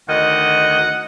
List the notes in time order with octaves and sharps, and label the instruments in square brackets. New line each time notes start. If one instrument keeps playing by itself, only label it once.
[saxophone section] D2 D#3 D#5 [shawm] F#5